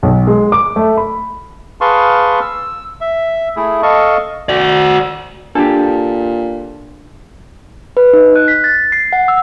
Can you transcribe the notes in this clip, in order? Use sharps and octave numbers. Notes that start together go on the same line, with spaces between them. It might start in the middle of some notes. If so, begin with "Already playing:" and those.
B1
G#3
D6
A3
B5
G#4 B4 F5 A5 C6 C#6
E6
E5
A3 E4 G#4
A4 D#5 F5 A5 C#6
F#4 D5
A#2 D4 G4 A4
B4
D#4
F#6
B6
A6
C7
F#5
E6